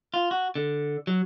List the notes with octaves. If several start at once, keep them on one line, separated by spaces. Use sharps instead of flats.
F4
F#4
D3
F#3